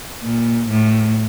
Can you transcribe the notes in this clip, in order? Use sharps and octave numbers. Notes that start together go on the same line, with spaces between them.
A#2
A2